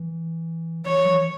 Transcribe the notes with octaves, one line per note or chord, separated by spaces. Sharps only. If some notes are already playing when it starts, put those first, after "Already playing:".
Already playing: E3
E3 C#5
F#3
E3